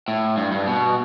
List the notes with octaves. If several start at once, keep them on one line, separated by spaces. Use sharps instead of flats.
A2
G2
G2
B2